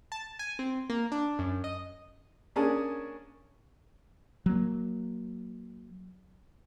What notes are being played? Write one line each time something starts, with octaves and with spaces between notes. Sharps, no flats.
A5
G#5
C4
A#3
D4
F#2
D#5
A#3 C#4 D4 G#4 A5
F#3 A#3